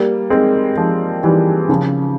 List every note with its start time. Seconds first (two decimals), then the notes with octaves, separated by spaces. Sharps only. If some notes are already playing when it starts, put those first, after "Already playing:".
Already playing: G3 A#3
0.30 G#3 C4
0.77 F3 G#3
1.23 E3 G3
1.69 C#3 F3